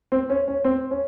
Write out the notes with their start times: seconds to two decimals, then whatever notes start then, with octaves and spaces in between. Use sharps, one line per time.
0.12 C4
0.30 C#4
0.48 C#4
0.64 C4
0.91 C#4